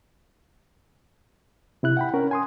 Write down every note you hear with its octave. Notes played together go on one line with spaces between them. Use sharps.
C3 E4 F#6
F#5 G5 B5
C#4 A#4 C#5
G#5 C6 D#6